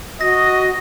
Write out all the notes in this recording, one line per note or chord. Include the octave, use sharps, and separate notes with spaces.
F#4 D#5 A#6